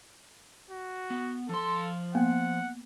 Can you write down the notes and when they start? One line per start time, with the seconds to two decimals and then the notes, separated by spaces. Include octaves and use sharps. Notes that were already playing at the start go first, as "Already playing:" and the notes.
0.70 F#4
1.10 B3
1.49 F3 A4 C6
2.15 A#3 B3 F#5 G5